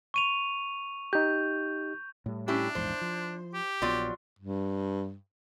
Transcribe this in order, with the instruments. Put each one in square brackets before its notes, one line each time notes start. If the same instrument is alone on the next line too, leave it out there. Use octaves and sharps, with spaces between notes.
[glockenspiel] C#6 D#7 F7
[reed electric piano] D#4 G4 [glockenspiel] G6
[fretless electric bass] A2 G3
[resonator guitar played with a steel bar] C#4 E4 G4 [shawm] D4
[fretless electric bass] A#1 E2 G#2 [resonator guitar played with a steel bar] C5
[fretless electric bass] F3
[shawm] G4
[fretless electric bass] A#1 B3 [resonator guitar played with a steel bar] F#3 F4 D5
[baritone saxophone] G2